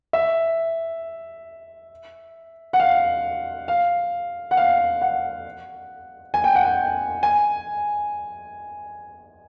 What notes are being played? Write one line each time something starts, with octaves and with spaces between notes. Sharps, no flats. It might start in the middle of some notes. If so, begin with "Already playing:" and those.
E5
F#5
F5
F5
F#5
F5
F#5
G#5
G5
F#5
G5
G#5